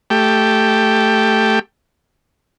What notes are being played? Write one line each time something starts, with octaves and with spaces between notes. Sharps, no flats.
A3 G4